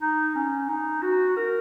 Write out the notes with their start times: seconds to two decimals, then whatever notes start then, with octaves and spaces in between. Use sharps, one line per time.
0.01 D#4
0.36 C#4
0.69 D#4
1.02 F#4
1.37 A#4